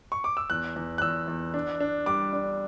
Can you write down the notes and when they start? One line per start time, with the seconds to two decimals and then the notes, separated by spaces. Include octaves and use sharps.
0.12 C#6
0.24 D6
0.37 E6
0.50 E2 F#6
0.76 E2
0.98 F#6
1.02 E2 E6
1.28 E2
1.54 D4
1.80 D4
2.06 G3 D6
2.33 D4